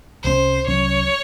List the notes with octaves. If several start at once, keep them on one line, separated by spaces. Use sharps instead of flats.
C2 C3 F#3 C#4 C5
C2 C3 F#3 C#4 C#5